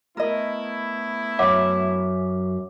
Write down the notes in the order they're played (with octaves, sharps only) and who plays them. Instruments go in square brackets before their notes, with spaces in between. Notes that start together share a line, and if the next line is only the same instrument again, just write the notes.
[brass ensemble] A3 B3 E4 [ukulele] A#4 D#5
[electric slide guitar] F#2 E5 [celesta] C#5 F#5 D6